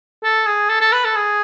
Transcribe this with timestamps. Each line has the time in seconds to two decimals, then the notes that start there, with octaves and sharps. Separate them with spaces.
0.24 A4
0.46 G#4
0.70 A4
0.81 A4
0.92 B4
1.05 A4
1.16 G#4